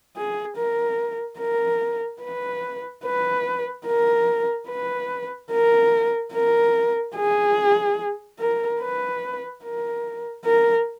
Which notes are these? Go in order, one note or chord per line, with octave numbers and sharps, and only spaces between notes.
G#4
A#4
A#4
B4
B4
A#4
B4
A#4
A#4
G#4
A#4
B4
A#4
A#4